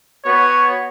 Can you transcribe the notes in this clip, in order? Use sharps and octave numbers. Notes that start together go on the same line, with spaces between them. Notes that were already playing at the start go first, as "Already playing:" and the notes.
B3 F#4 C#5